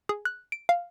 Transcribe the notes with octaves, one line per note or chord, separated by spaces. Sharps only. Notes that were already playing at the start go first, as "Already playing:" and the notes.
G#4
F#6
D7
F5